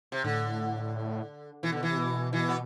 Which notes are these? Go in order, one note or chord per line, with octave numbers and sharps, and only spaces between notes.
C3
A2 D3
B2 E3
D3
E3
C3
B2
E3
B3